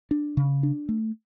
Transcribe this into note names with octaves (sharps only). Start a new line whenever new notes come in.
D4
C#3
D4
A3